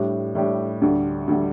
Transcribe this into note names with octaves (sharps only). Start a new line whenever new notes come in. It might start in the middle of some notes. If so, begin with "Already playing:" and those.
Already playing: A2 G3 D4 G4
A2 G3 D4 G4
D2 D3 G3
D2 D3 G3